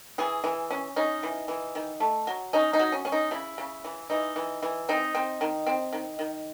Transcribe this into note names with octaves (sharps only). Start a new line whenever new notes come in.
E3 G#4
E3
C#4
C#4 D#4
E3
E3
D#3
A3
F#3
C#4 D#4
D#4
F#3
C#4
C#4
D#4
C#3 E4
C#3
E3
E3 D#4
E3
E3
C4 D#4
C4
D#3
C4
D#3
D#3